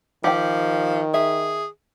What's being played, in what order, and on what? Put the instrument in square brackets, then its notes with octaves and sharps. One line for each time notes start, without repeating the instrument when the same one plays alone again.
[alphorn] D#3 [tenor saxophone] F3 [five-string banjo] G4 G5
[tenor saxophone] G#4 [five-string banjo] E5